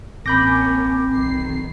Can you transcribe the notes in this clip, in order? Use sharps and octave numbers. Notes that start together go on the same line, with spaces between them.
A1 A#3 C4 C#4 B5 D6 G6 A#6
B1 D#3 C7